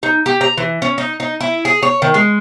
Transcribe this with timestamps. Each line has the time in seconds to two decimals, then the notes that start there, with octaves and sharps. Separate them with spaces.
0.03 D#4
0.26 G4
0.41 A#5
0.58 E3
0.82 C#4
0.98 D#4
1.20 D#4
1.40 E4
1.65 G#4
1.83 C#5
2.02 D#3
2.14 G#3